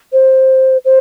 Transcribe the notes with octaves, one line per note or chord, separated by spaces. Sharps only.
C5
C5